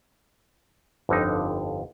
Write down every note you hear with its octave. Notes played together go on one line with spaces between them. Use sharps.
G1 F2 D3 D#4